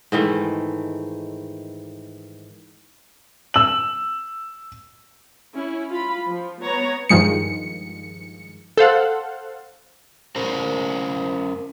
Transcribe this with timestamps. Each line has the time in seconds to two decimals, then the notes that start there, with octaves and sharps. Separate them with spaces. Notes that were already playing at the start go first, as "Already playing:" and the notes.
0.12 G#2 D#3 E3 A3
3.54 E6 F#7
5.55 C#4 E4
5.90 F4 B5
6.28 F3
6.63 B3 C#5 A#5
7.09 G2 D#3 F3 G#3 C#7
8.77 A4 C5 F5 F#5
10.36 C#4 A#4 C5